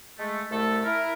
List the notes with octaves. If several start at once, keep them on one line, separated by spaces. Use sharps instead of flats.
G#3 A3
C2 A3 A4
E4 A#4